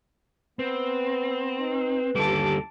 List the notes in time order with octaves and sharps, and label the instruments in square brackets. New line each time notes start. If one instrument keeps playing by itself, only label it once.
[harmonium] B3 [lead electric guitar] C4 [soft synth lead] B4
[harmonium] D#4
[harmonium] D#2 A4 [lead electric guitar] D3 G3 [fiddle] A5 D6